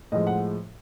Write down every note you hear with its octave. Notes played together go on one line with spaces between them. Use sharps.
A2 F3 G#3 D#5
F#5